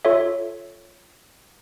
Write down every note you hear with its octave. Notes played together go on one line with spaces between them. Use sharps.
F4 A4 C#5 E5